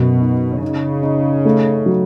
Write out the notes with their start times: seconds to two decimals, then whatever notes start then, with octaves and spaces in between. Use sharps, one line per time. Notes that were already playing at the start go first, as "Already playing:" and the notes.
Already playing: F#2 B2
0.21 D#4
0.62 C#3 D#4
1.03 D#4
1.45 A3
1.86 F#3